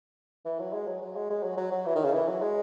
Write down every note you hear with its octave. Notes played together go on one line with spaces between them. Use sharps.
E3
F#3
G#3
F#3
F#3
G#3
G#3
F#3
F#3
F#3
E3
D#3
C#3
E3
F#3
G#3